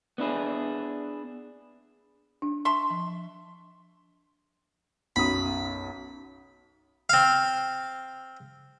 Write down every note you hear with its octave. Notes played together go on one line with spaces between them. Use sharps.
B3 D4 E4 G#4
D4
E5 A5 C6 C#6
F3
B1 F#2 B5 D#6
C4 F5